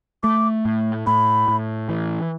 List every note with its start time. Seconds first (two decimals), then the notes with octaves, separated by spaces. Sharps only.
0.23 A3 D6
0.65 A2
1.06 A2 B5
1.48 A2
1.89 E3